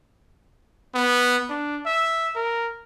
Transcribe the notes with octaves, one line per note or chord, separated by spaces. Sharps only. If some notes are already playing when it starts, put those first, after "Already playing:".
B3
D4
E5
A#4